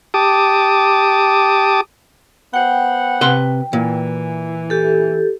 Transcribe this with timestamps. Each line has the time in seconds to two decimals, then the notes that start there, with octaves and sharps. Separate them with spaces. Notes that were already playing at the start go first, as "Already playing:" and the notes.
0.14 G4 A5 D6 D#6
2.54 B3 C5 F#5 G5
3.21 C3 B4 C6
3.73 A#2 E3
4.70 G4 A4